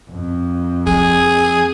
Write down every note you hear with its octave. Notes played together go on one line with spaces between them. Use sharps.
F2
F3 A#3 G#4